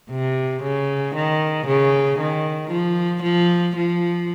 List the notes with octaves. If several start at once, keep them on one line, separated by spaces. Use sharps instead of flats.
C3
C#3
D#3
C#3
D#3
F3
F3
F3